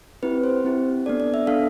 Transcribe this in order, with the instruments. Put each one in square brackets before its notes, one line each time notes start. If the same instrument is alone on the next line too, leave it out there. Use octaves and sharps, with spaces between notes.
[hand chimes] C4 E4 G4 B4
C5
C4 E4 G4
B3 D4 A4 D5
D5
E5
B3 D4 A4 F5